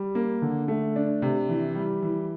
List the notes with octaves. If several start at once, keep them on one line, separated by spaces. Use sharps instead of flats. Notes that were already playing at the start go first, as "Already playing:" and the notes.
Already playing: G3
A#3
D3
A3
D4
C3
E3
G3
E3